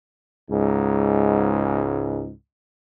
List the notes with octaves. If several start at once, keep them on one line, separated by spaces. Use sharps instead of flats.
C#2 G#2